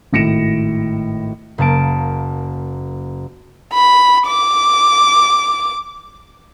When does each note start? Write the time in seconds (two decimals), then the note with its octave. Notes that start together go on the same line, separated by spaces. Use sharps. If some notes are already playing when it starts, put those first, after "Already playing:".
0.13 G#1 A2 A#6 C#7 D7 E7
1.58 F#1 A#3 A5 D7
3.73 B5
4.27 D6